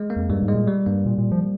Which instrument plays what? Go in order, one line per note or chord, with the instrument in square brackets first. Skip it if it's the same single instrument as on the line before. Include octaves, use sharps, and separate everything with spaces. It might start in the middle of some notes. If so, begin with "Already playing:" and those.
Already playing: [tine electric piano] G#3
A#3
[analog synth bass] F2
[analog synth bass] G2 [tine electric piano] G3
[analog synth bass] G#2
[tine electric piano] G#3
[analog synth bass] A#2
[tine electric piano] G3
[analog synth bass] G2 [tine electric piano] A#3
[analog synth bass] A#2
A#2
F3